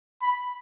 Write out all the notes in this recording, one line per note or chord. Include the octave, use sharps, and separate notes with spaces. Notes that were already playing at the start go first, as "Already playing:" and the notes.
B5